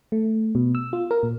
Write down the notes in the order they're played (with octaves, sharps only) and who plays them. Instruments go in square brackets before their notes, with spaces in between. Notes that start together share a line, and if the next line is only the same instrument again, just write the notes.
[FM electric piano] A3
B2
E6
F4
A#4
A#2